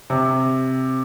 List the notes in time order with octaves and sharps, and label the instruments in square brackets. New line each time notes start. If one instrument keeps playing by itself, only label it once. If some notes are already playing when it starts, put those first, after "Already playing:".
[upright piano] C3